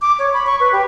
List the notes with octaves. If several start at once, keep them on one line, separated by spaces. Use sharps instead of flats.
D6
C#5
B5
C#6
B4
G4